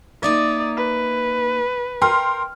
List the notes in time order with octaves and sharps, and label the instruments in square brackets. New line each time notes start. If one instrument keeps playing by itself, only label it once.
[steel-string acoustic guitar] A#3 D#4 E5 [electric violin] D5 D#6
[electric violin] B4
[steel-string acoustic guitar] A#4 [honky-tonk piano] G5 C6 F6